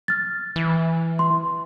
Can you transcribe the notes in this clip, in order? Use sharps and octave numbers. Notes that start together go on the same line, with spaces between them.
F6 A6
E3
C6